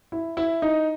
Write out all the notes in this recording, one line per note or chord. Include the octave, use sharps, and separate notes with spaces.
E4
E4
D#4